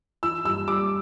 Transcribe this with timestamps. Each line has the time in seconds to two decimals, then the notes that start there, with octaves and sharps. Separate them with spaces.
0.23 E3 E6
0.45 G2 E6
0.68 G3 D6